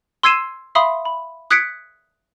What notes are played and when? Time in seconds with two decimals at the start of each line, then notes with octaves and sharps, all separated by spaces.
0.23 C6 E6 G#6 C7 D#7 E7
0.75 E5 F5 B5 C6 D#6
1.05 B5
1.50 D#6 F#6 G#6 B6 C#7 D7